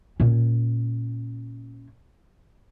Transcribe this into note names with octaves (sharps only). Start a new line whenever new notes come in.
A#2 C#4